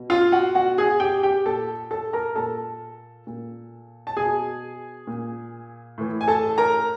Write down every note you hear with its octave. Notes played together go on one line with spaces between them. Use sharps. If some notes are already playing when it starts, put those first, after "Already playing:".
Already playing: B2
F4 F5
F#4 F#5
B2 F#4 F#5
G#4 G#5
G4 G5
G4 G5
A#2 A4 A5
A4 A5
A#4 A#5
A#2 A4 A5
A#2
A5
B2 G#4 G#5
A#2
A2 E3
G#5
A4 A5
A#4 A#5